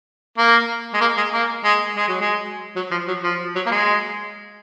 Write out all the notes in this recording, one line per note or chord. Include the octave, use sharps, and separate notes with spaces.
A#3
G#3
A#3
G#3
A#3
G#3
G#3
F#3
G#3
F#3
F3
F#3
F3
F#3
A#3
G#3